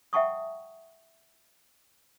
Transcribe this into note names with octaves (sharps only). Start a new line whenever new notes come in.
E5 F#5 G5 A5 C#6 D#6